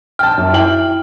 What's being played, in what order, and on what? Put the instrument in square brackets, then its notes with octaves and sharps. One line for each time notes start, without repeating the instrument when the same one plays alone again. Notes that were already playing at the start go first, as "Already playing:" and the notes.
[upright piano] G5 A5 [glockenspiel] F6
[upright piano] F#2
E4 G5 F#7